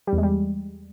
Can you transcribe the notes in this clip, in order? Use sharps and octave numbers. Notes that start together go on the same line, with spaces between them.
G3
E2
G#3
G3